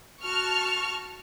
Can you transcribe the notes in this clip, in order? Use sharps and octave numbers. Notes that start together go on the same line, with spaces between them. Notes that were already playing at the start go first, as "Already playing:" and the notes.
F#4 A5 C#6 F6